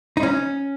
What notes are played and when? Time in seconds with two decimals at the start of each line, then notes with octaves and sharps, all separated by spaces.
0.17 D#4
0.23 C#4